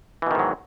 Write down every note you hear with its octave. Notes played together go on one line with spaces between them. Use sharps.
G#2 B2 D#3 E3 F#3